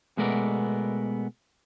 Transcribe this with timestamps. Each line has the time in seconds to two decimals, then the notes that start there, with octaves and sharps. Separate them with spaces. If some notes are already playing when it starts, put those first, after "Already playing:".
0.17 B2 G#3 A3 B3 A#4 D5